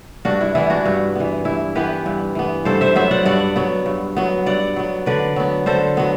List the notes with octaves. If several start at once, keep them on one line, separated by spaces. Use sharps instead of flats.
G2 D4 F#4
E4
E3 B3 E4
D4 F#4
G2
E3 B3
G2 E4
E3 B3 G4 B4
G2
E3 B3
G2 A4 C5
C5 E5
F#3 B3 C5 E5
D5 F#5
G2 D5 F#5
F#3 B3
G2
F#3 B3
G2 D5 F#5
F#3 B3
D3 B4 D5
F#3 B3
D3 A4 C5
F#3 B3